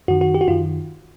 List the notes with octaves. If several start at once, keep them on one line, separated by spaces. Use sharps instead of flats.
F#2 D#3 F#4
F#4
G4
F#4
F#2 D#3 F4